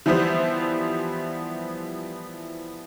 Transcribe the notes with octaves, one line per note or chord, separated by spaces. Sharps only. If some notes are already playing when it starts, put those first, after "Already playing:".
E3 F3 G3 B3 E4 C5